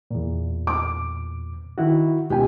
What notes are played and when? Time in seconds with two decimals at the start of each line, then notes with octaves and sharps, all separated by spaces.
0.11 E2 A#2
0.67 D6
1.78 D#3 E4 F#4
2.30 C#2 B2 G4 G#5